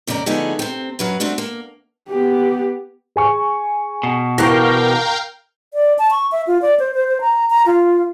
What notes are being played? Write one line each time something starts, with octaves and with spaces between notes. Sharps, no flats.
F2 C#3 A#3 D5 A#5
D3 F3 A3 B3 D#4 G#4
C3 C4
F#2 F#3 B4
A3 C4 D4 F#4
A#3
B3 G4
G#4 G#5 C#6
B2
E3 G4 A#4 F5 G5 C#6 F#6 A#6
D5
A5
C#6
E5
F4
D5
C5
C5
C5
A#5
A#5
F4